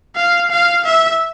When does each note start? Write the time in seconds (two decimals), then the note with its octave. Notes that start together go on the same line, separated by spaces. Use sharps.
0.16 F5
0.51 F5
0.85 E5